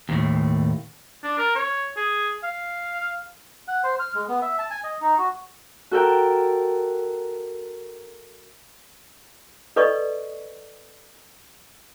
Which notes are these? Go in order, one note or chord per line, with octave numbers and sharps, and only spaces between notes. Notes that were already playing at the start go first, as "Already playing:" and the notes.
D#2 A2
D4
A#4
C#5
G#4
F5
F#5
C5
F6
G#3
B3
E5
A5
G#5
D#5
D#4
F#4
F#4 A4 A#4 G5
A4 B4 D5 D#5 C#6